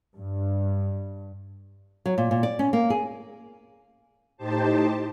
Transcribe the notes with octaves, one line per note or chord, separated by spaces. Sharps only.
G2
F#3
A#2
A#2
D5
C#4
A#3
G#4
A2 D#4 G4 C5 A5